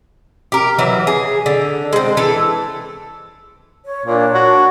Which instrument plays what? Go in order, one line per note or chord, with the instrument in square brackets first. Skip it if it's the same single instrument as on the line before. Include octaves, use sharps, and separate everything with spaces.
[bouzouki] G4 A#4
E3 F#3 E4
G#4
D3
G#3 C4
E3 A4
[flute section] C#5
[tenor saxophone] A#2 [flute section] D4 C#5
[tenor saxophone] F#4